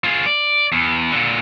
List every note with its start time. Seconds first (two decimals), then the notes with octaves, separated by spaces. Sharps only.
0.04 F4 G#4
0.26 D5
0.73 E2
1.12 A#2 D3